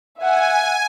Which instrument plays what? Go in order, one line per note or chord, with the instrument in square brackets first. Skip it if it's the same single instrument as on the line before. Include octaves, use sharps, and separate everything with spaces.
[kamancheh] E5 F#5 [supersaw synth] G#5